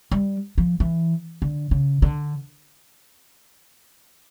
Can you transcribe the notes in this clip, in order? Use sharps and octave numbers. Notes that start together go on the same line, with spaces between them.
G3
F3
E3
D3
C#3
D3